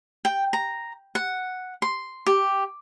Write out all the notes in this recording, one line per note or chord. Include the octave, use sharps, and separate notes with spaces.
G5
A#5
F#5
C6
G4